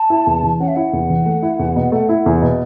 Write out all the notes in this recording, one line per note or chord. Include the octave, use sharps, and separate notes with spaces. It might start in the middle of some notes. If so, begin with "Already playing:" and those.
Already playing: A5
E4
E2
E3
C#4 F#5
E5
E4 F#5
E2
E3
A3
E4
E2
B2
A3
E4
E2
B2